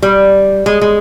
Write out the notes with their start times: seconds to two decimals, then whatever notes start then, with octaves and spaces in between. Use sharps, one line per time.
0.02 G3
0.66 G#3
0.81 G#3